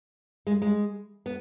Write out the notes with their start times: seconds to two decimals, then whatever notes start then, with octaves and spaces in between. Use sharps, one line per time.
0.47 G#3
0.62 G#3
1.26 B3